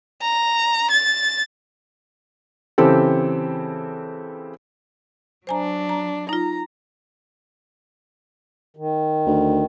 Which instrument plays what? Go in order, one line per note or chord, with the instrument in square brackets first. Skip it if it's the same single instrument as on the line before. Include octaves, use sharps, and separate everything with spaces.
[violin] A#5
A6
[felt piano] C#3 E3 C4 G4 A4
[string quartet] F#3 D4 [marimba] C5 G#5 A#5
[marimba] A#5
[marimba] D#4 F4 [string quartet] A#5
[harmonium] D#3
[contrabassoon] D2